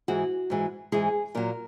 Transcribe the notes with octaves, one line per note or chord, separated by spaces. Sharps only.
G#2 E3 G#3 F#4
G#2 E3 G#3
G#2 E3 G#3 G#4
A#2 F#3 A#4